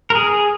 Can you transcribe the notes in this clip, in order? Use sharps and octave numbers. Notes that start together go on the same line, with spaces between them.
A#4
G#4